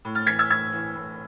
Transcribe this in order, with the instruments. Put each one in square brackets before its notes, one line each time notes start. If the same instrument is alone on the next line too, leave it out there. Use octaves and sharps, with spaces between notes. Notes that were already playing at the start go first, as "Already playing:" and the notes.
[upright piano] A2
F6 A6
E3 G#6 B6
E6 G#6
A2 E6 G#6
E3
A2